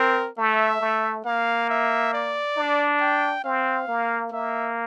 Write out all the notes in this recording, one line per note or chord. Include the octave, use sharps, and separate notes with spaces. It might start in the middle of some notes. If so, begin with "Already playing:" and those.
Already playing: C4 A#4
A3 E5
A3
A#3 F5
E5
D5
D4
G5
C4 F5
A#3
A#3 E5